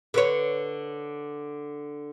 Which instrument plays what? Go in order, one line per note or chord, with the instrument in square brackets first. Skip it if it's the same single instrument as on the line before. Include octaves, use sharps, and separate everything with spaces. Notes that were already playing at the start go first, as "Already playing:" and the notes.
[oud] D3 B4 C#5